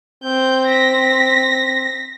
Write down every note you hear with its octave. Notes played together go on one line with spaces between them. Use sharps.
C4 G6
A#6 B6